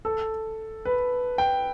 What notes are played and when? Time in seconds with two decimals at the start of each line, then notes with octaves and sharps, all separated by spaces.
0.05 A4
0.85 B4
1.38 G5